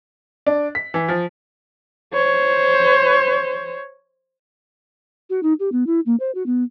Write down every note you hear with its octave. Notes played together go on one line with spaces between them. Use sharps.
D4
B6
E3
F3
C5 C#5
F#4
D#4
G4
B3
E4
A#3
C5
F#4
B3